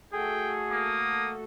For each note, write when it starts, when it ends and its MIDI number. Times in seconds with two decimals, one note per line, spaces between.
0.13 1.44 57
0.13 1.44 66
0.13 0.92 68
0.13 1.44 69
0.13 0.55 79
0.71 1.35 58
0.71 1.35 87